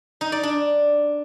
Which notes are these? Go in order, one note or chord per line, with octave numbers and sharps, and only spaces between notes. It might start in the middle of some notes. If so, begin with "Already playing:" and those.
D#4
D5
D4